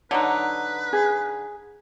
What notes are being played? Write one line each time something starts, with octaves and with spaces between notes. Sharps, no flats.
D3 F#3 D#4 B4
G#4